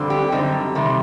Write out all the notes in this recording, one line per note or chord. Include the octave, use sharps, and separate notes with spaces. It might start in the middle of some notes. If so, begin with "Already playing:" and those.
Already playing: F2 D3 G3 C4
G4
F#2 D3 G3 C4 D#4
C3 D#3 G3